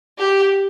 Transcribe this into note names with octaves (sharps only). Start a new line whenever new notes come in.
G4